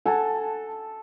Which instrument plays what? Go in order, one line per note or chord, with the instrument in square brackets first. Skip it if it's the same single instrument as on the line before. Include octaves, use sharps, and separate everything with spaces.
[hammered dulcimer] A4 [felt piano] F#5 G#5 A5